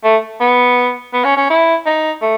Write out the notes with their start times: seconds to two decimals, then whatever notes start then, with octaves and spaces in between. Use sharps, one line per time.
0.04 A3
0.41 B3
1.13 B3
1.25 C#4
1.37 C#4
1.50 E4
1.86 D#4
2.22 A3